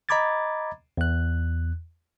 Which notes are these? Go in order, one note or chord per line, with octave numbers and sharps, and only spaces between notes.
D#5 A#5 B5 D6 G#6 A6
E2 F#6